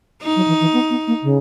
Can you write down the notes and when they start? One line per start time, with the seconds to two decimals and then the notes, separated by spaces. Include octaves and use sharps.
0.23 D#4
0.36 F#3
0.48 E3
0.61 E3
0.74 B3
0.90 B3
1.08 A#3
1.23 C#3